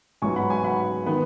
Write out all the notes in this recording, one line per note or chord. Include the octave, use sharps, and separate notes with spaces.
G#2 F#3 B3 G#5 C#6
F#5 B5
G#5 C#6
F#5 B5
D#3 B3